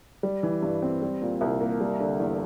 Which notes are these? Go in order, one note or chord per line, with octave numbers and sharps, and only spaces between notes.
G3
E3
G2
C4
G3
A#2
C2
A#3
G3
D3
E2